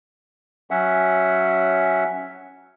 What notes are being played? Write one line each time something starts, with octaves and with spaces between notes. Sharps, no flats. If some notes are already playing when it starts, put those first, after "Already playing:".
F#3 C#4 E5 F#5